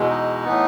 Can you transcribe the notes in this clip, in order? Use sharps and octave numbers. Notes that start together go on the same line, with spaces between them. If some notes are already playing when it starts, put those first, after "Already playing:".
Already playing: E2 B2 G#3
D#4
A2 E3 B3